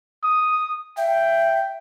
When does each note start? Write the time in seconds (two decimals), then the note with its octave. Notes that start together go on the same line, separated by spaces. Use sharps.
0.23 D#6
0.97 E5 G5